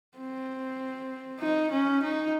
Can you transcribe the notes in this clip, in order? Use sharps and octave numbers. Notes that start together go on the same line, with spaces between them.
C4
D#4
C#4
D#4